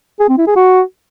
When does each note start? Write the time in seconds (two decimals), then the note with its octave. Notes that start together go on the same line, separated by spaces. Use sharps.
0.20 G#4
0.29 C4
0.38 E4
0.47 G#4
0.56 F#4